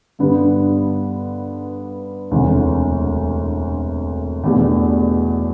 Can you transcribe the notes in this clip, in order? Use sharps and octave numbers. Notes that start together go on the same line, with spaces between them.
G2 D3 G3 B3 D4
E1 D2 C3 E3 A3
E2 B2 A3 D4 G4